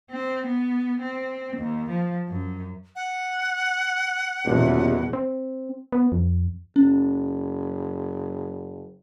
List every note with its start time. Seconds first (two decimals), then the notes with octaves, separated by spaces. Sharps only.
0.11 C4
0.46 B3
1.00 C4
1.57 D#2
1.90 F3
2.28 F#2
2.96 F#5
4.45 D#1 E2 B2
5.13 C4
5.92 B3
6.12 F2
6.76 F#1 C#4